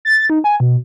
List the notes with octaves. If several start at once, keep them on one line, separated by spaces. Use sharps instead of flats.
A6
D#4
G#5
B2